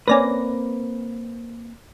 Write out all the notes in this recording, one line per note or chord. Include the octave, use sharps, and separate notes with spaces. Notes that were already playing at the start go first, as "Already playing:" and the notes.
A#3 C4 C#4 B4 D5 A#6